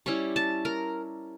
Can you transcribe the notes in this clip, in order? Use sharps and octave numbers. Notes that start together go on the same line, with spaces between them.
G3 C#4 E4 C#6
A5
A#4